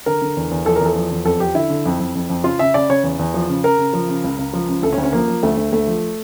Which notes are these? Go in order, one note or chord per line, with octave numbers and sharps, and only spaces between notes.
D3 A#4
D3
E2
E2
F3 A4
A#4
E2
A4
F3
E2
F2 A4
F3 G4
D3 E4
D3
F2
F2
F2
F2
C#3 F4
C#3 E5
C#3 D5
C#3 C#5
E2
E2
F3
C#3
C#3 A#4
C#3
F3
C#3
C#2
C#2
F3
C#2
D2 A4
C#4
D2
C#4
F3 A#3
F3
D2 A3
D2
D2 A3
F3